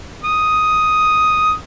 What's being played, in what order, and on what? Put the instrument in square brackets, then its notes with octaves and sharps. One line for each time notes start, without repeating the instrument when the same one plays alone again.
[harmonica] D#6